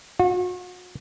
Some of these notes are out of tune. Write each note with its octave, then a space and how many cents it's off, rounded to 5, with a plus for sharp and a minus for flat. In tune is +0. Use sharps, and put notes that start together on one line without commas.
F#4 -40